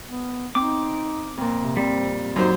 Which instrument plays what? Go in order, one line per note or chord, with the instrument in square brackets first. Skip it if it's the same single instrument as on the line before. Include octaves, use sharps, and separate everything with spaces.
[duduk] B3
[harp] C4 [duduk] D#4 [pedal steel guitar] D6
[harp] F2 A#2
[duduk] C3
[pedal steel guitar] G3 [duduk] C4
[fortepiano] F#2 C5 [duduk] D#4